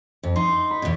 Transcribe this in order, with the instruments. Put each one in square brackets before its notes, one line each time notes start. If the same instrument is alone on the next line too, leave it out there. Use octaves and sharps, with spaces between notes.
[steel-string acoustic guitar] F2
[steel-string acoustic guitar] D#4 [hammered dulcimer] C6
[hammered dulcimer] B5
[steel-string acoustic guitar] E2 B2